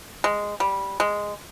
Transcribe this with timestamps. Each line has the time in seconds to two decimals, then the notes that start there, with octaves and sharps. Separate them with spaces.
0.24 G#3
0.60 G3
1.00 G#3